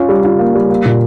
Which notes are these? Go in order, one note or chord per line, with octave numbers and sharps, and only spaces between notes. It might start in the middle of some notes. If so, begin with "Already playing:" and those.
Already playing: C#4 F4
G3
F4
A#3
G3
A#3
A#2